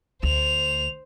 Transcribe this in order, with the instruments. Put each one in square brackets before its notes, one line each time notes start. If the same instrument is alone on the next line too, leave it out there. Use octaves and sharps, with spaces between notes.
[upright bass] D2 [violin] C5 F7